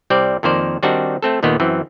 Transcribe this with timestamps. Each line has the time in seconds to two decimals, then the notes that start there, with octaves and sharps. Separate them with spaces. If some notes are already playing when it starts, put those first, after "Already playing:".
0.10 C2 G3 C4 D5
0.43 F2 D#3 A#3 C5 D5
0.83 D#3 G3 C4 D4 D#4 F#4
1.23 A3 C4 A4
1.43 D#2 A#2 D#3 A3 B3
1.60 F#2 E3 C4